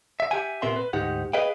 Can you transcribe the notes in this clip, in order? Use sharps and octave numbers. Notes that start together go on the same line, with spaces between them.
E5
G4 E5 F#5 G#5
A#2 B3 C4 A#4 E5 C6
B4
D2 G#2 D#4 G4 F#5
G#4 B4 D#5 F5 G5